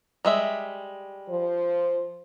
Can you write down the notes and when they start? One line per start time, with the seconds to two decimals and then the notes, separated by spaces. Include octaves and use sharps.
0.25 G3 G#3 E5
1.29 F3 C5